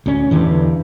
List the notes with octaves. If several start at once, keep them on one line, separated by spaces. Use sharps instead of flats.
D2 C#4
E2 G2 D3 E3